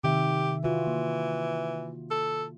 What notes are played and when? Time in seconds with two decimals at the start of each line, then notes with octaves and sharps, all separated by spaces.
0.04 C3 D#3 G4 E5
0.64 E3 F4 F#4
0.87 A#3
2.11 A4